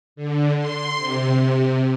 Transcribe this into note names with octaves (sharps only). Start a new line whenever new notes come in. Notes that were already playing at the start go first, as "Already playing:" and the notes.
D3
C6
C3